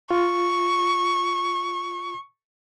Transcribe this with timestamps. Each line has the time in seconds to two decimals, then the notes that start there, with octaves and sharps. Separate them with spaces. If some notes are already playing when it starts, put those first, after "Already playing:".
0.11 F4 C#6